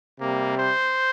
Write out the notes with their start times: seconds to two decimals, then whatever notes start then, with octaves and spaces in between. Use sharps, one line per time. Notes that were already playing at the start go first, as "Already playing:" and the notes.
0.20 C3 G3 A#3
0.58 C5